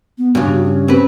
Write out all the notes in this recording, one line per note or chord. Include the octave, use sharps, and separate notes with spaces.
B3
G2 C#3 F#4
C#4
C4 B4